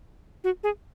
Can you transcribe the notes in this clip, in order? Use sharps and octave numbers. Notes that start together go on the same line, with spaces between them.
F#4
G#4